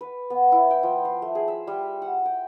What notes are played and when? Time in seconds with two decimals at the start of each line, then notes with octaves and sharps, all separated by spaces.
0.01 B4
0.30 B3
0.52 E4
0.71 G5
0.83 F3
1.05 C6
1.22 A3
1.35 G#4
1.48 E5
1.67 G3
2.02 F#5
2.25 G5